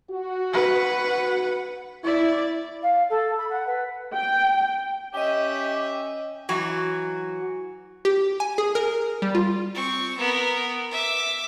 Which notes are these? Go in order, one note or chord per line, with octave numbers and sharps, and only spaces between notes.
F#4
B4 F#5
E4 D5
F5
A4
B5
F#5
B4
G5
C#4 G4 D#5 E5 G5
E3 F#3 F#4
G4
G#5
G#4
A#4
G3
F4
C4 C#6
B3 A#4
E5 D6